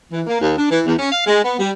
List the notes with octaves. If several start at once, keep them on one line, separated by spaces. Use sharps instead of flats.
E3
A#3
D#2
D4
E3
E2
C#4
F5
G#3
B3
G3